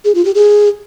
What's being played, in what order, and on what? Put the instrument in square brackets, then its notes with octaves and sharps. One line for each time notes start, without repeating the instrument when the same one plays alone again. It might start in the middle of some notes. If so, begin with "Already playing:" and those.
[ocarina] G#4
F4
G4
G#4